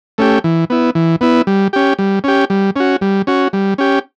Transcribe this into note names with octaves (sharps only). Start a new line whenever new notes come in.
A3 C#4 G4
E3
B3 E4
E3
B3 E4
G3
C#4 G4
G3
C#4 G4
G3
C#4 F#4
G3
C#4 F#4
G3
C#4 G4